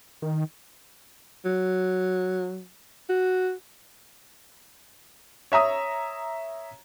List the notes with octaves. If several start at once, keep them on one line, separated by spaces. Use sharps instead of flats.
D#3
F#3
F#4
C#5 E5 A#5 D#6